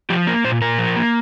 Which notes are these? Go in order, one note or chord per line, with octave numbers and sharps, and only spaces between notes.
F3 G4
A#3 A#4
A#2 C5
A#2 A#4
F3
A#3